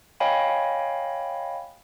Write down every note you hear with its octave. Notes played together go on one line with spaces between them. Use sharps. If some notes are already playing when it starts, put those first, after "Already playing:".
C#5 D#5 F5 G5 G#5 B5